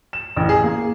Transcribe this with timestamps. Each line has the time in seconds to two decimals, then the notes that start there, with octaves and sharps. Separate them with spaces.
0.13 E7
0.36 A1
0.49 G#4
0.63 A#3